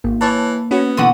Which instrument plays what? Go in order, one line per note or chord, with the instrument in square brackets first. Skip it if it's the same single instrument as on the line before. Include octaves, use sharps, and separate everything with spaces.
[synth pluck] G#1 [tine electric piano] A#3
[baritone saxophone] E3 [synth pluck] C#5 A5
[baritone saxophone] B3 [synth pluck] C#4 F#4
[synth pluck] B2 E3 D#7 [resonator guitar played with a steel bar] D3 F#4 F#5